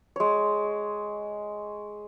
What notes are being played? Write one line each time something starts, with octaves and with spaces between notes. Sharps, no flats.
G#3 C#5